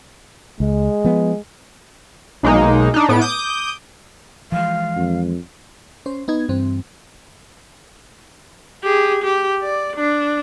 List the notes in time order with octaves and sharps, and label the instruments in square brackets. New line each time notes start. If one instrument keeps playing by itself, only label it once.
[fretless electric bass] C#2 [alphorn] G#3
[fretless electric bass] F3 B3
[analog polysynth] B1 G#3 A#3 D#4
D4 D#4
A2 B3 D7
D6 D#6 G6
[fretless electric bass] E3 F3 G#3 [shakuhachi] F5
[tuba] F2
[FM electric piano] C#4 C5
B3 D#4 G#6
G2 E3 C4
[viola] G4 G#4
G4
D5
D4